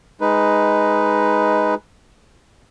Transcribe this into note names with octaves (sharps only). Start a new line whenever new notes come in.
G#3 D#4 B4